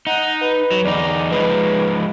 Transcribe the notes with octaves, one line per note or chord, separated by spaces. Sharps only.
D#4 F#5
B4
F#3
E2 D#4 D5
F3 G#3 D#4 B4